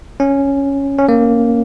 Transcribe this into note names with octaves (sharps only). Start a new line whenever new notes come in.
C#4
C#4
A#3